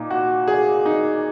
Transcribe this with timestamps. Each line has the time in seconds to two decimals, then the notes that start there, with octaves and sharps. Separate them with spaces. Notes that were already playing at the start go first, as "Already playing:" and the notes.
Already playing: A#2 A#3 D#4
0.10 F#4
0.48 G#4
0.86 D#4